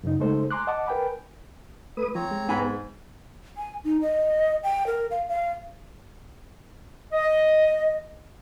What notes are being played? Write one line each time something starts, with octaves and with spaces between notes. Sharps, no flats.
F#2 C#3 D#4
C#3 G#3 A3 D#4 A4 C5
G#5 A#5 C6 D6 F#6
D#5 F#5 A5 D6
A#4 B4 G5 G#5 B5
A3 E4 B4 D#6
F3 C4 C#5 A#5
G#3
G#2 B3 G#4 G#5 B5
G#5
D#4
D#5
G5
A#4
F5
F5
D#5